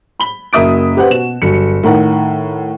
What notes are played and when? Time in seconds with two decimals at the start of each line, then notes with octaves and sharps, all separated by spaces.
0.20 B5 G7
0.53 F#1 F#3 A#3 E5 D#6 D7
0.97 G4 B4 C5 F#5
1.10 B2 F#4 E7
1.42 G1 F#3 C#7
1.83 A2 D#3 A#4 F#5